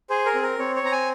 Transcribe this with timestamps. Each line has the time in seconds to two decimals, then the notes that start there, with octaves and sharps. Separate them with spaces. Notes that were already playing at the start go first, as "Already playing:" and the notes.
0.10 G#4 C5
0.26 A#4
0.34 C4
0.42 A#4
0.59 C4 C#5
0.76 C#5
0.83 C4 A#5
0.92 G#5